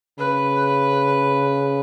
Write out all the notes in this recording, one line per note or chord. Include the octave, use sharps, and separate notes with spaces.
C#3 B4